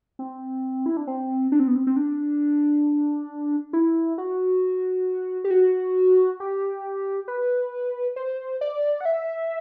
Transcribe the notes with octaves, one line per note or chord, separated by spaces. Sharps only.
C4
E4
D4
C4
D4
C4
B3
C4
C4
D4
E4
F#4
G4
F#4
G4
B4
C5
D5
F#5
E5